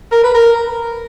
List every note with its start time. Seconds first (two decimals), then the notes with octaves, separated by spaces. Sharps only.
0.12 A#4
0.24 B4
0.34 A#4